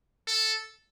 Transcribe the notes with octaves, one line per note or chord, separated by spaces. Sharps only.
A4